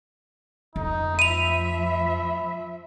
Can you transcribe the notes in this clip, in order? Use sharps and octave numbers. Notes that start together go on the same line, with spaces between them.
F2 D#4
F3 E5 B5 D#7 F7